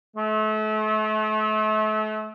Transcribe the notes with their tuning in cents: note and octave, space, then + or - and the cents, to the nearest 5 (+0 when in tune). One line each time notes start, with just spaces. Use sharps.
A3 -35